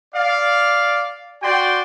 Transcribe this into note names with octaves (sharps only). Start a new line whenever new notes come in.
D5 F5
F#4 D5 G5 C6